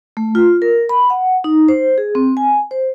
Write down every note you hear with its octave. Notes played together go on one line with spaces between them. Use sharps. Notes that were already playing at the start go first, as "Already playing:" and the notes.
A3
F4
A#4
B5
F#5
D#4
C5
G#4
C4
G#5
C5